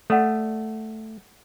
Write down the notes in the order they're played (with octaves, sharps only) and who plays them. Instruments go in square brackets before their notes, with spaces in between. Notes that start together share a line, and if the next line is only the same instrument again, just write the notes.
[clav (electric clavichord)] A3 [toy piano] A4 D5 F#5